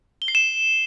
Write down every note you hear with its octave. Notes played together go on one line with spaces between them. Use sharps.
G7
C7
E7